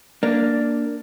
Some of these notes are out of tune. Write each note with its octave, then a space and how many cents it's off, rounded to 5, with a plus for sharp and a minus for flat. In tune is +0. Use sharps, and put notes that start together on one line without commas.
A#3 +0 D4 +0